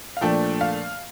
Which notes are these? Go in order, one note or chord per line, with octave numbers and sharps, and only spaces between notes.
F5
A#2 F3 A3 D4 G5
F5